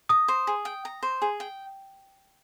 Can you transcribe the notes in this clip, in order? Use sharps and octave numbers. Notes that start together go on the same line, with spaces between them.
A#5 D#6
C5
G#4
G5
A#5
C5
G#4
G5